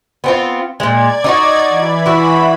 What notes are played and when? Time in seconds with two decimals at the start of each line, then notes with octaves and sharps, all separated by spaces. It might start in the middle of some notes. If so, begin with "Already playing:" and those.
0.24 B3 C4 F4
0.80 A#2 G#3 D5 G#6
1.24 D#4 F4 F#4
1.69 E3 B5
2.06 E4 F#4